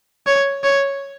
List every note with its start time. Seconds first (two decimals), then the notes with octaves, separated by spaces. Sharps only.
0.27 C#5
0.64 C#5